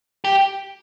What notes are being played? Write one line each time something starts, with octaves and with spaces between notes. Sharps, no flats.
G4